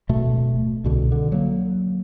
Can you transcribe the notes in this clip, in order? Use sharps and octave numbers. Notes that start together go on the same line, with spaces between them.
D1 B2 A3
C2 B2 D3
D3
F#3 A#3